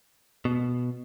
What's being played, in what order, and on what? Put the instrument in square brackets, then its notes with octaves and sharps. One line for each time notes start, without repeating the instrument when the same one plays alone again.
[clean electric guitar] B2